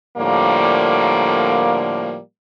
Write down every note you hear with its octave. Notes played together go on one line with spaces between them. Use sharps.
A2 D3 F3 G3 A#3